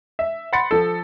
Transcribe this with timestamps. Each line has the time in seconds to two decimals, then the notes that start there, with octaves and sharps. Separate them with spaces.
0.19 E5
0.53 F#5 B5 C6 A6 C#7
0.71 F3 A4